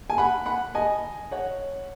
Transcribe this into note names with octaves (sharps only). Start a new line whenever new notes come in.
G#5
F#5 B5
F#5 B5
D#5 G#5
C#5 F#5